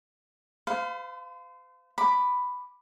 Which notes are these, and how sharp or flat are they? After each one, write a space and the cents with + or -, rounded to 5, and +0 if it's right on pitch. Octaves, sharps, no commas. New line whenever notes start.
C5 -40 F5 +0 B5 +25
B5 +5 D6 +15